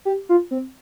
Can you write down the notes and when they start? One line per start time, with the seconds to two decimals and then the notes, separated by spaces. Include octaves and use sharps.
0.05 G4
0.29 F4
0.51 C4